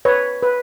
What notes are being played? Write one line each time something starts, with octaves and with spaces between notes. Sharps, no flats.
B4 C#5
B4